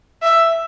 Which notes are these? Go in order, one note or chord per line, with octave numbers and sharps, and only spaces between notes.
E5